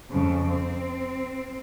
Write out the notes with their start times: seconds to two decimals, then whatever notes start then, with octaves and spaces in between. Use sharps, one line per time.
0.11 F2 C#3
0.49 C4